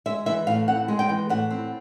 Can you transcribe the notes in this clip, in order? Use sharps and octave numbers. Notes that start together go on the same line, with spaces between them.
G#3 E5
E3 E5
A2 F5
C4 F#5
G#3
G5
E3
A2 F#5
C4